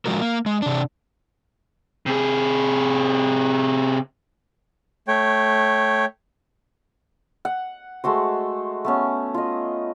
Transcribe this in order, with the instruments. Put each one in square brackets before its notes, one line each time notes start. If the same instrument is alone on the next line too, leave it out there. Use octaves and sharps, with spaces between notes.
[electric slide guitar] D3 F3 G#3 F#4 A#4
A#3
G#3
C3 D4
[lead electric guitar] C3 G#4
[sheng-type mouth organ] A3 C#5 G5
[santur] F#5
G#3 A3 F#4 C5
A3 B3 C#4
F4 D#5